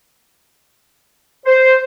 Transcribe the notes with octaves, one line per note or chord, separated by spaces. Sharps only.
C5